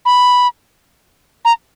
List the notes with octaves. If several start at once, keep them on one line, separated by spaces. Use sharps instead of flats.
B5
A#5